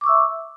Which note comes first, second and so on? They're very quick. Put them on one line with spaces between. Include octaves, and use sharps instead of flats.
D6 C#6 E6 E5